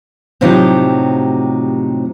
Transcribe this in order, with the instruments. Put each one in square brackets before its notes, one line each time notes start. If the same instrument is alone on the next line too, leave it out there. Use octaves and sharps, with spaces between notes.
[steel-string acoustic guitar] A2 C3 F3 F#3 D#4 G4